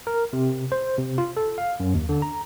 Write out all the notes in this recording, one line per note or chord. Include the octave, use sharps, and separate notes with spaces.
A#4
C3
C5
C3
F4
A4
F5
F#2
D#2
D3
A#5